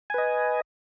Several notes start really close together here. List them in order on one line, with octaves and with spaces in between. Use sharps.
G#5 B4 D#5